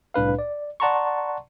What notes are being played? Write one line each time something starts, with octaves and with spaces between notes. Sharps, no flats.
C2 A2 D4 B4 F5
D5
D5 F#5 A5 A#5 C6 C#6